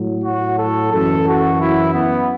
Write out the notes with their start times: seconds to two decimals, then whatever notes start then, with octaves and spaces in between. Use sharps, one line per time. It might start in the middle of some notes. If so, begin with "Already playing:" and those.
Already playing: A2 F#3
0.24 F#4
0.58 A4
0.91 F#2 E3 A4
1.25 F#4
1.59 E4
1.92 B3